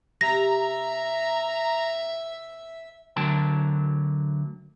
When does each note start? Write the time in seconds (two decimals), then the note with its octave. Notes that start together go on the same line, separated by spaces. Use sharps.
0.21 C3 E5 A#5 A#6
3.16 D2 D3 F#3 A#4 G5 A5